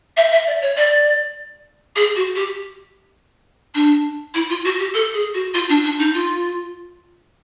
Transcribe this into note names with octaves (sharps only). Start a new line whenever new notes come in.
E5
E5
D5
C#5
D5
G#4
F#4
G4
D4
E4
F4
F#4
G4
A4
G#4
F#4
F4
D4
D4
D#4
F4